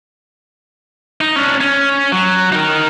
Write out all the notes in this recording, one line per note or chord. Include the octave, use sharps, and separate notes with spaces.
D#4
C#4 D4
C#4
F#3
D#4 A#4